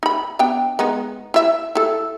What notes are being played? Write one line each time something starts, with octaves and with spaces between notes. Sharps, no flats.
D#4 B5
B3 D4 G5
G#3 B3 D#4
E4 E5
E4 A4